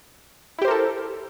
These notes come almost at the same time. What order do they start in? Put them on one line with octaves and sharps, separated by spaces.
E4 G4 C5 A#4 A4